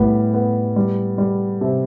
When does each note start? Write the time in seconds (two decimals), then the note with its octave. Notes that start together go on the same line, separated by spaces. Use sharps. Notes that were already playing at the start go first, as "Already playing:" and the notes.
Already playing: A2 G3 B3
0.34 B3
0.76 G3
1.18 G3
1.61 C3